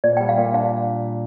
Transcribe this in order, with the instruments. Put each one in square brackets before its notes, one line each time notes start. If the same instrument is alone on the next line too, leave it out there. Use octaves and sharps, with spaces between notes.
[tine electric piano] A#2 [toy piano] D5
[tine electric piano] G3 [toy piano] G5
[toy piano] F5
[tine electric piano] A#2
[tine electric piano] D4 [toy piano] F5